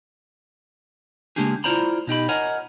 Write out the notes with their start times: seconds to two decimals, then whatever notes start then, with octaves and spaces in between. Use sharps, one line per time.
1.36 C#3 G#3 A#3 D4 G4 G#4
1.64 E4 F4 C5 D5 A#5 B5
2.07 B2 D#4 G4 B5
2.29 A#4 C#5 D#5 F#5 G#5 A#5